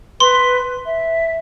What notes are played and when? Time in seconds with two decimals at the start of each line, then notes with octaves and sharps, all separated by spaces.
0.20 B4 C6
0.86 E5